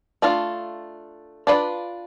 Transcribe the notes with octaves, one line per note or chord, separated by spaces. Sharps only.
A3 D4 F4
D4 F4 B4 D5